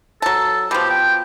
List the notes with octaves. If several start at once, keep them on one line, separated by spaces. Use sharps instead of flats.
F#3 A4 A5
B2 F3 G4
G5